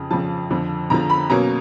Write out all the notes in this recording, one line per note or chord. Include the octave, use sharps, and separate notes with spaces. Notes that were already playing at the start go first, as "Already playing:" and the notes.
Already playing: F2 C#3 F3
F2 C#3 F3 A5
F2 D3 F3
F2 D3 F3 A#5
B5
B2 F#3 A#3 C#4 A#5